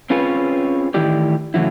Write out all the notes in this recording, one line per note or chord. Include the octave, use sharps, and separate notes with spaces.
C4 C#4 F4 G#4 B4 C#5
A2 D#3 E3 E4 G4 D5
A2 C#3 E3 F#3 E4